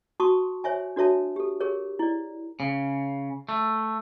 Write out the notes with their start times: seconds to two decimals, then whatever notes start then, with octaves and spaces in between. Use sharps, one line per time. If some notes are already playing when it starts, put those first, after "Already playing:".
0.20 F#4 A5 C6 C#6 D#6
0.64 C5 C#5 E5 G#5
0.96 D4 F#4 A4 C#5 E5 A5
1.36 G4 A4
1.60 G4 G#4 A#4 C#5
1.99 E4 D5
2.60 C#3
3.49 A3